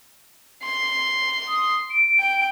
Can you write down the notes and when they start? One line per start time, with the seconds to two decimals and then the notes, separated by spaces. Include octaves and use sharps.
0.64 C6
1.47 D#6
1.89 D7
2.19 G5